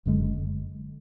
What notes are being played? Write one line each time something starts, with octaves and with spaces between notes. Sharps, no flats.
F#1 F#2 D3 G#3